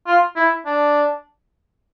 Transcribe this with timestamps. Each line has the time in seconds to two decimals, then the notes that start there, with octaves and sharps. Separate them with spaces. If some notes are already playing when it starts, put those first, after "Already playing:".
0.07 F4
0.36 E4
0.66 D4